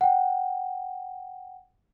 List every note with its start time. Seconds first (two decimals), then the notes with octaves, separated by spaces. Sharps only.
0.01 F#5 G5